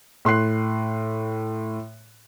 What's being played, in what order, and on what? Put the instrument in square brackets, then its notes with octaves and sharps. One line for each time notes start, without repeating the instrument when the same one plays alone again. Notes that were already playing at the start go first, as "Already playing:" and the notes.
[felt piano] A2 C6 F#6 C7